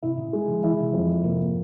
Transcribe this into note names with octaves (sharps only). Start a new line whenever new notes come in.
G#2 C3 E4
A#2 C#3
G#3
C#3 F3
E3 E4
C#3
C3 E3
F2
G#2 C3 A#3